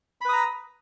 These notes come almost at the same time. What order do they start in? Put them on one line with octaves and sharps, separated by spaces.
B5 B4 D#6 A#5